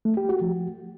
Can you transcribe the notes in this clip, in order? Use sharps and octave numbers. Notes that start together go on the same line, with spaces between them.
A3
G4
F#4
F3